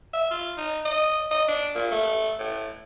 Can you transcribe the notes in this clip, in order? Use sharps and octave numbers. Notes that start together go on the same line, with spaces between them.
E5
F4
D#4
D#5
D#5
D4
A#2
A3
A2